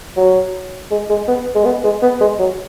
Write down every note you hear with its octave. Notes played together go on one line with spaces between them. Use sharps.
F#3
G#3
G#3
B3
G#3
B3
G#3
B3
G#3
F#3